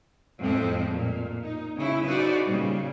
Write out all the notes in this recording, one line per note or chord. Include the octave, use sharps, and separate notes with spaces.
F2 A2 G#3 C4
A#2
D#4
C#3 E4
D#4 F#4 G#4 B4 C5 D5
A#2 C#3 G3